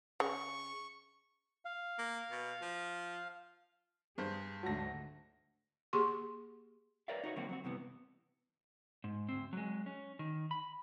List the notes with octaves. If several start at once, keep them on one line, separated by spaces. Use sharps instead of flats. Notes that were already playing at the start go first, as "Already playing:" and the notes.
C#3 C#6
F5
A#3
B2
F3
G2 G#4 C5
D2 G#2 F#3 A3 A5 A#6
A#3 G4 G#4 C6 C#6
A#4 B4 C#5 D5 E5 F5
D#4 F#4 C#5
D3 F#3 A#3 C4 F#4
F#3 C4 F#4
G2 C3 E3 B3
G#2
D2 C4
F#3 G#3
C#4
D#3
B5